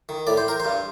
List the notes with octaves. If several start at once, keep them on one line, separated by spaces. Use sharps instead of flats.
D#3
A2 D5
C5
A#4
C5
G2